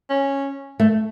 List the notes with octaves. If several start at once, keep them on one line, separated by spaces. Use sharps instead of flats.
C#4
A3